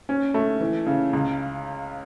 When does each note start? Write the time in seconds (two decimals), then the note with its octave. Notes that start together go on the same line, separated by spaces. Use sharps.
0.09 C#4
0.34 A3
0.60 E3
0.86 C#3
1.13 C#2